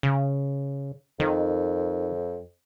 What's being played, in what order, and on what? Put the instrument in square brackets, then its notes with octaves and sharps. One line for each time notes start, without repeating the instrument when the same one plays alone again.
[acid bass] C#3
[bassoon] F2 [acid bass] D#3